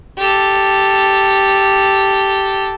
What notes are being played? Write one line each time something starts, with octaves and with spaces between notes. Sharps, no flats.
G4 A4